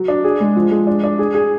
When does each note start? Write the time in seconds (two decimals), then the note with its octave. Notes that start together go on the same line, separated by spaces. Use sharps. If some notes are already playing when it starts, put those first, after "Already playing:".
Already playing: F#3
0.08 D4
0.24 G#4
0.40 G#3
0.56 F3
0.71 G#3
0.87 D4
1.04 D4
1.19 G#4
1.34 G#4